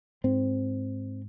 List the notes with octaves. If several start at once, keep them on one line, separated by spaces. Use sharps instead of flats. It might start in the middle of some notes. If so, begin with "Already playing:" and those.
G#2 C4